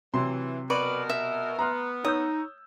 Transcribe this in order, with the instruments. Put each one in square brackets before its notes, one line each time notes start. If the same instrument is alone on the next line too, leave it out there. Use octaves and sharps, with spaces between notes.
[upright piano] C3 F#3 C6 [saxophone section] E3
[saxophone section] B2 A#4 [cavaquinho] B4 D5 C#6
[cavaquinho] E5
[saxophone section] B3 [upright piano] A#5 C6 F6
[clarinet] D#4 [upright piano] C#5 E6 G6 [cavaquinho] D#6